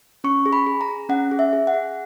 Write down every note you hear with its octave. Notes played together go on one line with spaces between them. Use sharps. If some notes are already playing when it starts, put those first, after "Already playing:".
C#4 C#6
G#4
B5
G#4
A#5
G#4
C#4 F#5
G#4
E5
G#4
F#5
G#4